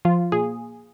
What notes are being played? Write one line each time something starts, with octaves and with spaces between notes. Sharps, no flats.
F3 F4
A#2 G#4